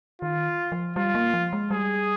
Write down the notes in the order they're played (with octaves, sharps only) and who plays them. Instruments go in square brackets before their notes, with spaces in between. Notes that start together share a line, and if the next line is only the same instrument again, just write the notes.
[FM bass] D#3 [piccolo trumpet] F4
[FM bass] F3
[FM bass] G3 [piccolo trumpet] F4
[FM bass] A#3
F3
G#3
[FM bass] G3 [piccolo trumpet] G#4